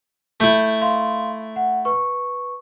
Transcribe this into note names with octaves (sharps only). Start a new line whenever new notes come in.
A3 E4 G6
F5 C6
F#5
B4 C#6